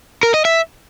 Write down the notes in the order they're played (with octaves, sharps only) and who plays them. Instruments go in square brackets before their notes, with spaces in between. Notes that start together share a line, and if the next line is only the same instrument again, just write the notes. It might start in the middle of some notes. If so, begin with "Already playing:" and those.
[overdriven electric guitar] A#4
D#5
E5